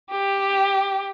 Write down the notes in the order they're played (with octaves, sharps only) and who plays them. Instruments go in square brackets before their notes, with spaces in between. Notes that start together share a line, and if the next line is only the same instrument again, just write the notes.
[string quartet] G4